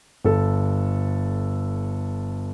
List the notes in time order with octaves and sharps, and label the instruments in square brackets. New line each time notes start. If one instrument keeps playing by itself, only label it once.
[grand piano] G1 A4